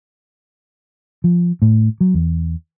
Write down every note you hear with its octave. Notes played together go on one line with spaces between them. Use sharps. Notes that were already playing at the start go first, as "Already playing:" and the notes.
F3
A2
F#3
E2